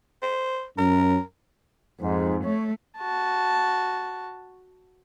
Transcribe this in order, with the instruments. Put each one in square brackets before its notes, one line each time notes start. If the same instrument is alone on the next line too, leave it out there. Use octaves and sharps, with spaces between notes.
[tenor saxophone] C5
[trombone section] F#2 C#4 [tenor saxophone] A#4
[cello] F2 [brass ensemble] G#2
[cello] A3 [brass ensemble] C#5
[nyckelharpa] F#4 A5